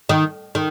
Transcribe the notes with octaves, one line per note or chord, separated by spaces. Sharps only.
D#3
D#3